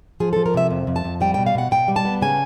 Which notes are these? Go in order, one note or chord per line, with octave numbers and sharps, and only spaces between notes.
F3 G#4
F3 A4
A#4
C3 E5
F2
F2
A5
F2
G3 G5
B2 G5
F5
B2 F#5
B2 G5
G3
A5
B3
C#3 G#5